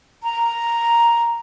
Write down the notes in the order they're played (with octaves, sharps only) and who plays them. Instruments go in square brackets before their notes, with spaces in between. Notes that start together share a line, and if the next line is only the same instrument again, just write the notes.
[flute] A#5